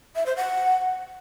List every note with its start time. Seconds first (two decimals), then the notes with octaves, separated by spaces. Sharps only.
0.15 E5
0.26 C5
0.37 F#5